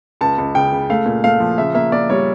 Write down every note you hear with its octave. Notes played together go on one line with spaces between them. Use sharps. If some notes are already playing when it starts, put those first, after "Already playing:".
C#2 A5
C#2
C#3 G5
C#3
A3 F5
A#2
A3 F5
F3
C#3 E5
A#3 E5
A#3 D5
G3 C#5